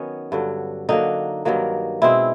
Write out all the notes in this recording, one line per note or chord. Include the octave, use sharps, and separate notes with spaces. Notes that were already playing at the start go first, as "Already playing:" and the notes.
Already playing: D#3 F#3 B3 C#4
G2 D3 F#3
D3 F#3 A#3 D#4
G2 D#3 F#3 A#3
B2 G#3 C4 E4